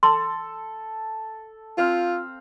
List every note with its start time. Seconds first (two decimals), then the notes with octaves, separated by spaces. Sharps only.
0.03 A4 C6
1.78 C4 F4 F5